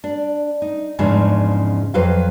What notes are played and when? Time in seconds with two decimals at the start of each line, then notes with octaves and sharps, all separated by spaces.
0.04 D4
0.62 D#4
0.99 E2 G#2 C#3 F3 D4
1.94 F2 F#3 B4 C5 F5